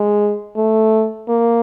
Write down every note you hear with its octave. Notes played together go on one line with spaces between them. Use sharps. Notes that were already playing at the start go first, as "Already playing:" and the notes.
Already playing: G#3
A3
A#3